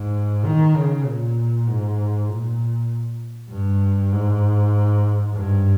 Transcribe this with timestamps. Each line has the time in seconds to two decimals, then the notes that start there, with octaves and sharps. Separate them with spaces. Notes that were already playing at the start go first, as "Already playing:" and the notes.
Already playing: G#2
0.45 D#3
0.76 C#3
1.06 A#2
1.68 G#2
2.29 A#2
3.50 G2
4.12 G#2
5.34 G2